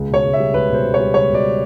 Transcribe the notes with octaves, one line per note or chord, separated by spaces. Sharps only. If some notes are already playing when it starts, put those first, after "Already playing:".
Already playing: C#2
B2
C#5
C#2
E5
G3
C#2 B4
B2
C5
C#2
C#5
G3
C#2 C#5
B2
D5